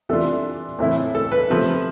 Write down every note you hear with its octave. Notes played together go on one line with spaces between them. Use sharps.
C3 E3 A3 D4 F4 A4
A2 E3 A3 C4 E4
A4
B4
C3 F3 A3